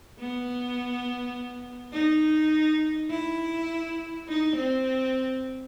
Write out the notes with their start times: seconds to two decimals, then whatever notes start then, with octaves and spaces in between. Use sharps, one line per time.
0.19 B3
1.93 D#4
3.10 E4
4.28 D#4
4.56 C4